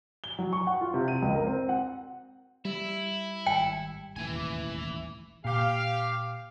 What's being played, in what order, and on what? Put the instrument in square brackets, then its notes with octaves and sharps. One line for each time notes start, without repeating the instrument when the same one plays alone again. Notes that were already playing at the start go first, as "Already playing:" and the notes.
[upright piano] G7
F#3
C#6
F#5
F4
C3
D#7
C#2
A#4
C4
F#5
[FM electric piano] G3 [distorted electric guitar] E4
[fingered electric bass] G#1 [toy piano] G5
[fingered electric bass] E1 A1 D#2 [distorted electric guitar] E3 G#5
[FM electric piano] A#2 [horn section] G4 F5